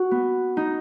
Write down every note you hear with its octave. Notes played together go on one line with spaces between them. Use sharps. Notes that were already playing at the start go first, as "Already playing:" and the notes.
Already playing: F#4
B3
D#4